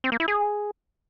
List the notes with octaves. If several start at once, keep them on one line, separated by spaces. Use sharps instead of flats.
C4
A#3
E4
G#4